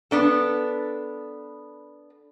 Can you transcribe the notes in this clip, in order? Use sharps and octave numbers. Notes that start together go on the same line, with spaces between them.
B3 D4 A4